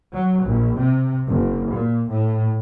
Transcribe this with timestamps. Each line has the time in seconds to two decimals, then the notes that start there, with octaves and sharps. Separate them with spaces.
0.13 F#3
0.45 A#1
0.78 C3
1.26 F#1
1.72 A#2
2.10 A2